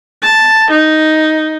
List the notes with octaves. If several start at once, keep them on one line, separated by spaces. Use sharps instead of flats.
A5
D#4